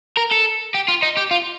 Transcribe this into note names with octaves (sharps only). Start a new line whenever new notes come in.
A#4
A4
G4
F4
D#4
G4
F4